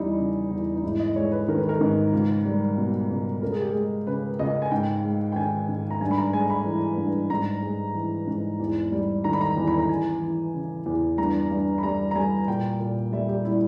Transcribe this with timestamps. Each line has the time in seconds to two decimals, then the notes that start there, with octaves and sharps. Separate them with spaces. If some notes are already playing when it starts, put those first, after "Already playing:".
Already playing: E2 G3 D#4 E4
0.19 C#3
0.51 E2
0.76 D#4
0.83 G#2 E4
1.00 D#5
1.16 G#3 C#5
1.32 B4
1.48 D#3 A#4
1.58 B4
1.69 A#4
1.81 G#2
2.13 C#2
2.45 G3
2.77 B2
3.10 C#2
3.42 C#2 A#4
3.52 G#4
3.62 G4
3.72 G#3 G#4
4.07 C#3 B4
4.39 C#2 D#5
4.62 G#5
4.71 G#2 G5
5.04 G#3
5.32 G5
5.36 D#3 G#5
5.69 G#2
5.90 A#5
6.01 G2 G#5
6.11 B5
6.17 A#5
6.33 G#3 G#5
6.50 B5
6.65 E3
6.98 G2
7.30 G#2 A#5
7.63 G#3
7.95 E3
8.27 G#2
8.60 E2
8.92 G3
9.24 D#3 A#5
9.33 B5
9.41 A#5
9.57 E2
9.68 B5
9.78 A#5
9.89 E2 G#5
10.21 E3
10.54 C#3
10.86 E2
11.18 G2 A#5
11.51 G2
11.78 B5
11.83 G3 A#5
12.11 A#5
12.16 G3 G#5
12.48 A#2 G5
12.80 A#2
13.12 G3 E5
13.29 G4
13.45 G3 E4